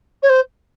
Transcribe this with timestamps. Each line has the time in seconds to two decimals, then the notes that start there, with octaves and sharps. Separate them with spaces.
0.22 C#5
0.29 C5